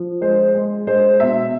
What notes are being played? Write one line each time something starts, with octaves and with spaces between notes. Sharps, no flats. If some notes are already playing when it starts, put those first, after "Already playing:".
Already playing: F3
G#3 C5
G#3
G#3 C5
B2 E5